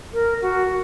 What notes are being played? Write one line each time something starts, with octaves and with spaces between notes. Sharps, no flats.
A#4
F#4